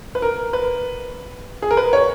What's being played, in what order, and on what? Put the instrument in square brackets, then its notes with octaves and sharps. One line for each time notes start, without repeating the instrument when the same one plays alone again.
[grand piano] B4
A#4
B4
G#4
A#4
B4
C#5